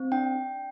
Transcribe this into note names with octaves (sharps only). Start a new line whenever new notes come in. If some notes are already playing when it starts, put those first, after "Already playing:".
Already playing: C4
D4 G5
D4